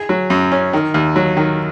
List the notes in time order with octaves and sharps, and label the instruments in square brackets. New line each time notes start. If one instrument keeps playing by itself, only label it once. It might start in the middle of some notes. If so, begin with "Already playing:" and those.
Already playing: [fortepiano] G#4
F#3
F#2
C#4
D#3
D#2
F#3
D#3